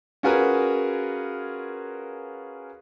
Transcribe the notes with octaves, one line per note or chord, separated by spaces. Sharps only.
C#4 F4 F#4 G#4 A#4 B4